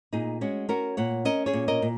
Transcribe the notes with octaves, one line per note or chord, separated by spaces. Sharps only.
A#2 D#4 G#4
G#3 C#4 F#4
C#4 F#4 A#4
A#2 C#5 F#5
C#4 A#4 D#5
G#4 C#5
A#2
A#4 D#5
A#2